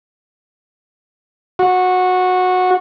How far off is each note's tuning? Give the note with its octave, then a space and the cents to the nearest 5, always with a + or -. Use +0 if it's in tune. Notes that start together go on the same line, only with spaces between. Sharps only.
F#4 -15